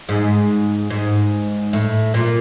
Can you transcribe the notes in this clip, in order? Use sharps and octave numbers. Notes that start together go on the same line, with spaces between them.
G#2
G#2
A2
A#2